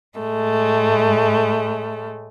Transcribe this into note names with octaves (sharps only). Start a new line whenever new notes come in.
A2 G#3 A3